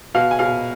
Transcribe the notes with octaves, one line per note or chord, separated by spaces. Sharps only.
B2 F5
G#5
B2 F5